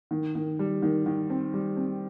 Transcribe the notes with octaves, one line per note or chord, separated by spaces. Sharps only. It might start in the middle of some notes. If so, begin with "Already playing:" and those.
D#3
D#3
G3
D#3
D#3
C4
G3
C4